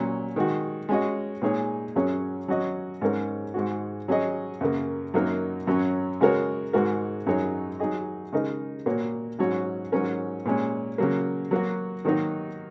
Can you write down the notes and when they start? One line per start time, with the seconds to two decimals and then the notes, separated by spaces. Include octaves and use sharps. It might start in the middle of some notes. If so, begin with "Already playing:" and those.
Already playing: A#2 F#3 C#4
0.36 D#3 G#3 F#4
0.89 G#3 C#4 F#4 D#5
1.42 A#2 G#3 D#4 G#4 C#5
1.96 F#2 F#3 C#4 G#4 C#5
2.48 F#3 C#4 F#4 D#5
3.01 G#2 G#3 C#4 A#4 C#5
3.54 G#2 G#3 F#4
4.08 F#3 C#4 G#4 D#5
4.61 F#2 C#3 A#3
5.14 F#2 F#3 A#3 D#4 A#4
5.67 F#2 F#3 C#4
6.21 C#3 G#3 F#4 A#4 C#5
6.73 G#2 G#3 F#4 A#4
7.26 F#2 F#3 D#4 G#4 C#5
7.80 F#3 D#4 G#4 D#5
8.33 C#3 G#3 D#4 A#4 D#5
8.86 A#2 A#3 F#4 C#5
9.39 G#2 F#3 C#4 F#4 C#5
9.92 G#2 F#3 C#4 A#4
10.46 A#2 G#3 C#4
10.98 C#3 F#3 A#3
11.51 F#3 A#3 F#4
12.05 D#3 F#3 A#3 D#4 F#4